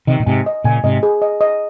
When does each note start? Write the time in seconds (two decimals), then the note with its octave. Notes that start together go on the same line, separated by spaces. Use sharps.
0.07 C3 D#3 D#5
0.20 A#2
0.26 G#2 C3 G#5
0.46 D#5
0.64 A#2 C#3 G#5
0.84 G#2 C3 D#5
1.03 G#4
1.22 D#5
1.41 D#5